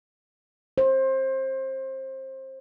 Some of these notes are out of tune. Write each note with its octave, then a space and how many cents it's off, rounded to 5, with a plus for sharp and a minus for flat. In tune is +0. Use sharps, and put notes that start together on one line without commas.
C5 +25